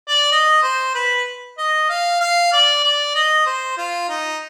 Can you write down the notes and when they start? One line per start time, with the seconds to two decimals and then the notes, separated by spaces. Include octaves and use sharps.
0.08 D5
0.32 D#5
0.63 C5
0.95 B4
1.58 D#5
1.89 F5
2.20 F5
2.52 D5
2.84 D5
3.15 D#5
3.46 C5
3.78 F4
4.09 D#4